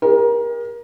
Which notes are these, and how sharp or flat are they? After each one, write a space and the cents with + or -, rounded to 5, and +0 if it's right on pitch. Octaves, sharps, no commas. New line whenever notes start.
G4 +45 A#4 +25